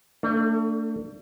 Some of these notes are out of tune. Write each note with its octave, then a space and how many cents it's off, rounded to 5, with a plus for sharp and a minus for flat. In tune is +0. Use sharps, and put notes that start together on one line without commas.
A3 +40 D4 +0 A4 +0